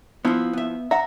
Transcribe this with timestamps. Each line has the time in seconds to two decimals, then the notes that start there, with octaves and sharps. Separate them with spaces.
0.25 F3 B3 E4 F4
0.53 B3 E5
0.91 E5 F#5 A#5